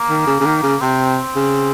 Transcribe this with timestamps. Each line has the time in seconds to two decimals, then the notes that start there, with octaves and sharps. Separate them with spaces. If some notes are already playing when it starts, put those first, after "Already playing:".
Already playing: A#3
0.09 D#3
0.27 C#3
0.40 C#3
0.46 D#3
0.63 C#3
0.81 C3 C4
1.35 C#3